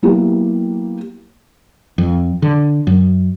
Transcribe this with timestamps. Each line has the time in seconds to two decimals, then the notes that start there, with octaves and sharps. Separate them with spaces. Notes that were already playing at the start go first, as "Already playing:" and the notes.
0.02 F#3 A#3 B3 E4 G4
1.98 F2
2.42 D3
2.87 F#2